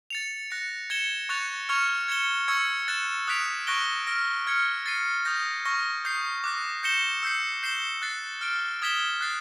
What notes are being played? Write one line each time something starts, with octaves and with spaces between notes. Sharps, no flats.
A6 C#7 F7
F#6 A#6 C#7
G#6 C#7 E7 G7
C#6 F#6 A6 C#7 F7
C#6 F6 G#6 C#7 F7
G#6 C#7 E7 G7
C#6 E6 G#6 C#7
F#6 A6 C#7 E7
D#6 F#6 B6 D7 F7
C#6 F#6 A#6 D7 G7
F6 A#6 D7
F6 G#6 C#7
A6 C7 D#7
D#6 G6 A#6
C#6 F6 A#6
D#6 G6 C7
D6 F#6 A#6
G6 A#6 C#7 E7 G7
E6 G6 C7
G6 C7 E7 G7
F#6 A6 C7
F6 A6 D7
D#6 G#6 B6 E7 G7
F#6 A6 C7